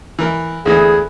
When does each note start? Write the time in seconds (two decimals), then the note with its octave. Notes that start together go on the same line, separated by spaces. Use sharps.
0.19 E3 A#4
0.66 D2 E3 B3 G#4